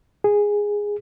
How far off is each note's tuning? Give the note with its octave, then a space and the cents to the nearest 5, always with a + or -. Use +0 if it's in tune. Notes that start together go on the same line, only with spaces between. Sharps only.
G#4 -10